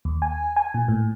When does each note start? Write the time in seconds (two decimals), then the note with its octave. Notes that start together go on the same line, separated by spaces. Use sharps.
0.05 D#2
0.22 G#5
0.56 G#5
0.74 A#2
0.88 A2